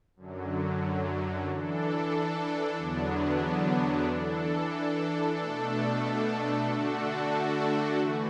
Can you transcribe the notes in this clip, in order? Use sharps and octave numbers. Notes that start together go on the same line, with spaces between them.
F#2 D3 F#3
E3 D4 A4
E2 D3 F#3 B3 D4
E3 D4 A4
B2 A3 D4 A4
D3 A3 D4 F#4 A4
E3 A3 F#4